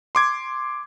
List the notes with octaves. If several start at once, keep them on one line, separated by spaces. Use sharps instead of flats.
C6 D6 G#6